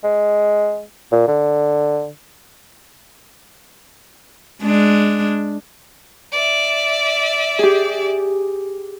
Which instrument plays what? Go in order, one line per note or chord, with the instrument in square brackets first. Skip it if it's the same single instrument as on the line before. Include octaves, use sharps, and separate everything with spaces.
[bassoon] G#3
A#2
D3
[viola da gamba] G#3 D4
[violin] D5 E5
[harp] G4 G#4